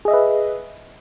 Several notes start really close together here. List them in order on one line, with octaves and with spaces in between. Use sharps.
G#4 D#5 E5 B4